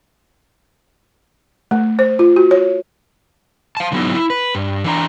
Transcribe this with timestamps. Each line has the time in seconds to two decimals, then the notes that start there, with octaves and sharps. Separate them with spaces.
1.71 A3
1.99 C5
2.19 F4
2.36 F#4
2.51 C#5
3.77 F5 A5
3.92 D3 F#3 G#3 B3 D#4 E4
4.14 E4
4.30 B4
4.55 G2
4.84 E3 D4 A#5